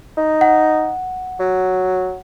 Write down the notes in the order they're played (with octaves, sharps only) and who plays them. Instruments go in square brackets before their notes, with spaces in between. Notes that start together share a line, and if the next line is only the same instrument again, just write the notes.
[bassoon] D#4
[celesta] F#5
[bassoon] F#3